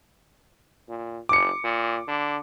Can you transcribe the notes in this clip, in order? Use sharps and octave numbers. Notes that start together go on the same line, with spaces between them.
A#2
F#1 D6 C#7
A#2
D3